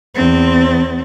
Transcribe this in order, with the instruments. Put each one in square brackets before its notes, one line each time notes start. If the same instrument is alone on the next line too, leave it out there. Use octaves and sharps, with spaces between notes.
[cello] E2 C4